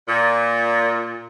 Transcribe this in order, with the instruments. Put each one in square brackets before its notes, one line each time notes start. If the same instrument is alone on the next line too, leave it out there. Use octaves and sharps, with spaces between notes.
[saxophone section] A#2